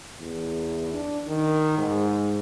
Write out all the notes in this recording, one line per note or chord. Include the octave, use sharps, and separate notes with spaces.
E2
D4
D#3
G#2